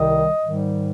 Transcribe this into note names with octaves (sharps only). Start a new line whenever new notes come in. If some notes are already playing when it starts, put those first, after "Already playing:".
Already playing: C2 C3 D#3 G3 D#5
G#2 D#3 G3